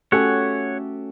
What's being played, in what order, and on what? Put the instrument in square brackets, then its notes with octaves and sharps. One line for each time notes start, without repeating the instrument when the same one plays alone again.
[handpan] A3 C#4 F#4 [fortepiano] G4 A4 G#5 [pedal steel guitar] C#5 F#5